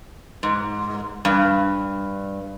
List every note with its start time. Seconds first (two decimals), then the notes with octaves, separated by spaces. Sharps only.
0.43 G#2
1.25 G2